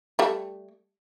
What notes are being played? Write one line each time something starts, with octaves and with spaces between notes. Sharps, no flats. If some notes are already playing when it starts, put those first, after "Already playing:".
G3 A3